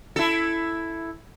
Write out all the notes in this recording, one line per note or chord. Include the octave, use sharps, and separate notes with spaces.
E4 A4